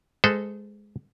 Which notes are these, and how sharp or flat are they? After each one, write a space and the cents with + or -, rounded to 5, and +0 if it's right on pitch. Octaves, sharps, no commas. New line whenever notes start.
G#3 +0 A4 +0 C5 -35